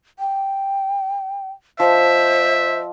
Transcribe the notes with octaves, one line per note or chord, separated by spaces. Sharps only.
G5
F3 C5 D#5 E5